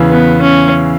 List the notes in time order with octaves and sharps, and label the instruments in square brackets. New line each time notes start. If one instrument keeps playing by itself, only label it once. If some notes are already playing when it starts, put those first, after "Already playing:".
Already playing: [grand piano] E2 C#3 E3
[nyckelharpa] B3
C#4